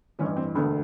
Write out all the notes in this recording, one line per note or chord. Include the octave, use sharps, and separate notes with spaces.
A1 G2 E3 C#4
C4
E1 D2 D3 B3